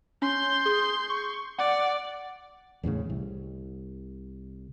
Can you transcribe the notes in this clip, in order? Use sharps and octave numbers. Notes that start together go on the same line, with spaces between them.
C#4 C6 G6
G#4
C#6
D5 F#5
D1 E2 A2 C#3
C2